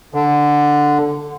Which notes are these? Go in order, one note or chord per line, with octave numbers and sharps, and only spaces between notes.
D3